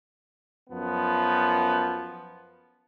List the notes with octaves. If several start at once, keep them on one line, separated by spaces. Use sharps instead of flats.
F#2 F3 B3